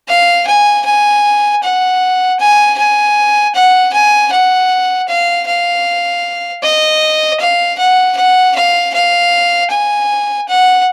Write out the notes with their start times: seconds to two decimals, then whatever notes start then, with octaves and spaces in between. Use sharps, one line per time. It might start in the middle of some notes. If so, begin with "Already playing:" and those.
0.08 F5
0.47 G#5
0.86 G#5
1.63 F#5
2.40 G#5
2.78 G#5
3.55 F#5
3.93 G#5
4.32 F#5
5.09 F5
5.47 F5
6.63 D#5
7.41 F5
7.79 F#5
8.17 F#5
8.55 F5
8.94 F5
9.71 G#5
10.49 F#5